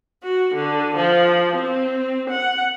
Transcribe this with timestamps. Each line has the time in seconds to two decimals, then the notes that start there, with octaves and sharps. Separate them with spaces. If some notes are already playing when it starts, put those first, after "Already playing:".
0.23 F#4
0.55 D3
0.96 F3
1.55 C4
2.30 F#5